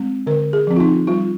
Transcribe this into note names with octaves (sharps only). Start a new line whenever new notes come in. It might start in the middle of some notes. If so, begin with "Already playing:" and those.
Already playing: G#3 C4
D3 A#4
G#4
F3 C4
F4
D#4
G3 F4